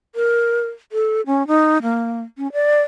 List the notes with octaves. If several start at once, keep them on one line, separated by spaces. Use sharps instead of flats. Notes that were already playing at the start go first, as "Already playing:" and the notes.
A#4
A4
C#4
D#4
A#3
C#4
D5